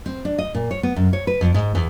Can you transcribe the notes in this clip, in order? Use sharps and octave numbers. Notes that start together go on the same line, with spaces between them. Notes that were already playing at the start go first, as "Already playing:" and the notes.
C4
D4
D#5
A#2
C#5
B3
F#2
C#5
B4
F2
G#2
E2